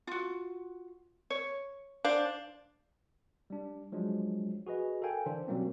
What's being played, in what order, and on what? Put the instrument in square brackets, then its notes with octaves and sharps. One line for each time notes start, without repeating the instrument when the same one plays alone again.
[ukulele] F4 F#4
C#5
[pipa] D4 [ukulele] C5 F5
[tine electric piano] G3 D4
F3 F#3 G#3 D4
F#4 G#4 B4 D#5
A4 A#4 F5 G5 G#5
D3 E3 D4 C5
B2 F#3 G3 A#3 C4 C#4